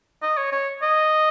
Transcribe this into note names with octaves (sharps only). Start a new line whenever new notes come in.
D#5
C#5
C#5
D#5